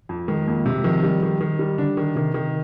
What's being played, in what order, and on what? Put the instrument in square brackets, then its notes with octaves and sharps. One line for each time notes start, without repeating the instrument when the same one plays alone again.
[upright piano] F2
[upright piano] D#3 [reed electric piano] G#3
[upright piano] F2 [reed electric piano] A#3
[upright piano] C3 [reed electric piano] G#3
[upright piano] D#3 [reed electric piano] F3
[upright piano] G3
D#3
D#3
G3
[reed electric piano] D3 [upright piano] D4
[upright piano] D#3
[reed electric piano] C3 [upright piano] D#3
[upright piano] D#3